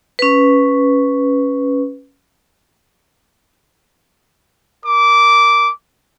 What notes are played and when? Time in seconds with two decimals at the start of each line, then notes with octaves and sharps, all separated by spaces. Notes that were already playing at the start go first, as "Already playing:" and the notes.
0.19 C#4 B4
4.84 A#4 D6